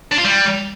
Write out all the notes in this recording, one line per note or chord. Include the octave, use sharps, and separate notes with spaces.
D4
F4
G3